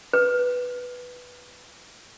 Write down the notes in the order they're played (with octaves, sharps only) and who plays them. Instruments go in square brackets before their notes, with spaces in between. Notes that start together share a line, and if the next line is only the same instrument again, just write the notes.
[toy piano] B4